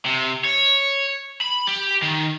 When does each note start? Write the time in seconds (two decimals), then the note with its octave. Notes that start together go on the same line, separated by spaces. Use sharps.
0.06 C3
0.44 C#5
1.41 B5
1.67 G4
2.02 D#3